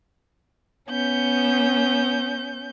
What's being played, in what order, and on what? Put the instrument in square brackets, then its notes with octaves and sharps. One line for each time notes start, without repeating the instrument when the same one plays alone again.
[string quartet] B3 C#4 G6